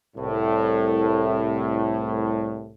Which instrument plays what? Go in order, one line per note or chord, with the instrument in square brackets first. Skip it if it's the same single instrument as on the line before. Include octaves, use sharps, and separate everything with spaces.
[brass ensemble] C2 A2